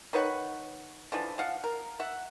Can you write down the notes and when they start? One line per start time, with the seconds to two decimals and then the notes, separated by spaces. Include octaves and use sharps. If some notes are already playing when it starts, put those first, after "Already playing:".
0.13 D#3 B4 C#5 F#5
1.12 D3 E3 F3
1.38 F3 F5 F#5
1.64 A#4
2.00 E5 F#5